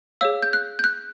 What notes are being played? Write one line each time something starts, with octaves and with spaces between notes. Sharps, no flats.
G#4 C#5 F5 E6
G6
F#6
G6
F#6